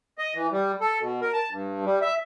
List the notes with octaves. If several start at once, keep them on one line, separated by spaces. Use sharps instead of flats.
D#5
E3
G3
A4
B2
A#4
A5
G2
G3
E5